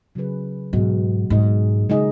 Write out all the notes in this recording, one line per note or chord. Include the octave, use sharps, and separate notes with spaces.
C#3 F#3 C#4 G#4 B4
G#2 B2 F#3 B3 F#4 D#5
G#2 G#3 D#4 G#4 D#5
C#3 G#3 D#4 G#4 D#5